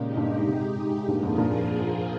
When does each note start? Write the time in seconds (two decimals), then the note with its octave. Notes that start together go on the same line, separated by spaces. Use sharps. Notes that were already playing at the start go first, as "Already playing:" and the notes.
Already playing: A#2 C#3 G#3 D#4 G4
0.17 G2 A#2
0.47 G#2 C3
1.07 G2 A#2 F3 A#3 F4 G#4
1.23 F2 G#2
1.38 G2 A#2